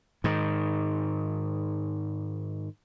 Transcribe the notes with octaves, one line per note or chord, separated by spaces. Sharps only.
G#2 D#3